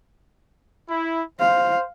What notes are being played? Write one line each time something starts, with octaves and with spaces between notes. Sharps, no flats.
E4
C5 F5